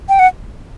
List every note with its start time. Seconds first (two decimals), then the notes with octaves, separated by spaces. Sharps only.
0.09 G5
0.19 F#5